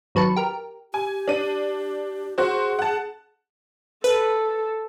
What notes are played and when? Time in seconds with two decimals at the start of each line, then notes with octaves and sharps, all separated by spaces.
0.15 G#1 F#3 B4 A5 C#7
0.36 G4 A#4
0.94 G4 G#5
1.28 D4 D#7
2.38 F#4 G#4 C5
2.79 F#5 A5
4.04 A4 B4